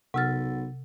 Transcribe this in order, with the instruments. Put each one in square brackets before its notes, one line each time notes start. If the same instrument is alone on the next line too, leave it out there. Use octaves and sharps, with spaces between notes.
[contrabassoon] B1 [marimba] C3 F6 [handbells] F#5 E6 A6